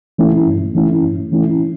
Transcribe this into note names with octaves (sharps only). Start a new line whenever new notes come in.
E3 A3 C#4 E4
G2
E3 A3 C#4 E4
G2
E3 A3 C#4 E4